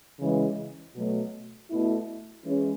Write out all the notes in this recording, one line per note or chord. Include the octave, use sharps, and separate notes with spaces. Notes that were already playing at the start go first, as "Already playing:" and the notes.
C#3 E3 G#3
B2 F#3 A3
B2 A3 E4
E3 G#3 C#4